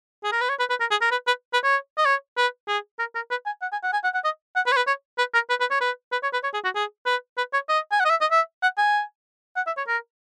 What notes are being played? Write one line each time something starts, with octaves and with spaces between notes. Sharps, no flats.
G#4
A#4
B4
C#5
B4
B4
A#4
G#4
A#4
B4
B4
B4
C#5
D#5
C#5
B4
G#4
A#4
A#4
B4
G#5
F#5
G#5
F#5
G#5
F#5
F#5
D#5
F#5
B4
C#5
B4
C#5
B4
A#4
B4
B4
C#5
B4
B4
C#5
B4
C#5
G#4
F#4
G#4
B4
B4
C#5
D#5
G#5
F#5
D#5
E5
D#5
E5
F#5
G#5
F#5
E5
C#5
A#4